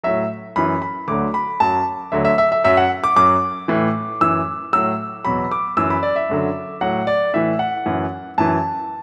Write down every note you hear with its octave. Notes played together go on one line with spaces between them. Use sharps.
A2 F#3 E5
F#2 E3 B5
B5
D2 D3 F#3 D6
B5
F#2 F#3 A5
D2 D3 F#3 E5
E5
E5
E5
F#2 F#3 E5
F#5
D6
F#2 F#3 D6
A2 E3
F#2 E3 E6
A2 F#3 E6
E2 B2 F#3 B5
D6
F#2 E3 E6
B5
D5
E5
F#2 D3 F#3
A2 F#3 F#5
D5
A2 E3 E5
F#5
F#2 E3
F#2 E3 A5